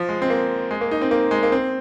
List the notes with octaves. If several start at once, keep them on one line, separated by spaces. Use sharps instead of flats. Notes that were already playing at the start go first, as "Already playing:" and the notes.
Already playing: F3
G#3
C4
A#3
G#3
A#3
D#4
C4
A#3
G#3
A#3
C4